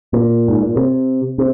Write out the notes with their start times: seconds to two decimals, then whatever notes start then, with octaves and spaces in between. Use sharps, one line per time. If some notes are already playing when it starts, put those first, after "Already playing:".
0.13 A#2
0.48 G#2
0.62 A#2
0.76 C3
1.38 C3